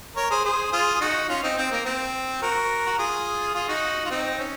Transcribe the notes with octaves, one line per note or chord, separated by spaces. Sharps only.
A#4 C#5
G#4 C5
G#4 C5
F4 G#4
G#4
D#4 F#4
C#4 F4
C4 D#4
C4
A#3
C4
F#4 A#4
F#4
F4 G#4
F4 G#4
D#4 F#4
F4
C4 D#4
C#4